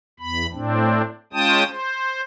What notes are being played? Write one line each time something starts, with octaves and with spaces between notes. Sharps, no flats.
E2 B5
A2 C4 D4
G#3 C#4 F4 G5 A5 D#6
C5